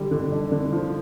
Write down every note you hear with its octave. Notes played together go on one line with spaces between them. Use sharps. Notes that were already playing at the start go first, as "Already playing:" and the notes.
Already playing: D3 G3
D3
D4
D3
F3